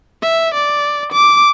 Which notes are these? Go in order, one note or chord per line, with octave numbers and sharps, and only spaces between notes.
E5
D5
D6